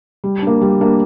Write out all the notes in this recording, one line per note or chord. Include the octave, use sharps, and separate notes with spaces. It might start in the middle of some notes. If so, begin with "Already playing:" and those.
G3
A#3 D4
G3
A#3 D4